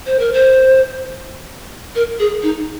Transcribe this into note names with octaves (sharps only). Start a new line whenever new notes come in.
C5
A#4
C5
A#4
G#4
D#4